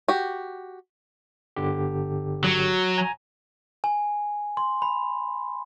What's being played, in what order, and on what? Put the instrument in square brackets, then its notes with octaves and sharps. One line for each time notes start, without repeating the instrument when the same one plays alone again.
[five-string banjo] F#4 G4
[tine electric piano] G1 D3 G4
[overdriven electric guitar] F#3
[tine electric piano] G#5 A#5
[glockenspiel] G#5
C6
B5